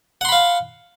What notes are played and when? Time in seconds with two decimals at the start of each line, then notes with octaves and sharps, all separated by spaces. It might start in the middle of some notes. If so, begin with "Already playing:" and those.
0.21 F#5
0.25 C6
0.29 B5
0.32 F5